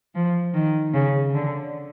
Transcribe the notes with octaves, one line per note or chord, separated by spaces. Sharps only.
F3
D#3
C#3
D3